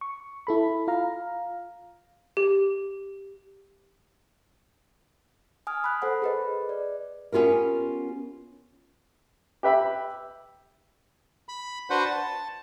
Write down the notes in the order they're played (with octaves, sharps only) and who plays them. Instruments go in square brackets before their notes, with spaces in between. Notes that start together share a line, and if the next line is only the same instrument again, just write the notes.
[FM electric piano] C#6
E4 A4 B5
F4 F5 A#5
[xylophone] G4
[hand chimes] G#5 D#6 F6
B5 F#6
A4 C5 F#5 B5
G#4 B4 D#5
D5
[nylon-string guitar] B3 C#4 F4 G4 A#4
[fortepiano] G4 B4 E5 B5
[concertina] B5
D4 F#4 B4 C5 F#5
A5